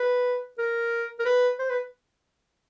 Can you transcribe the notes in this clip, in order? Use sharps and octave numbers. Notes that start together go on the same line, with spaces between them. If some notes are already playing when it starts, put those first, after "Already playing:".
Already playing: B4
A#4
A#4
B4
C5
B4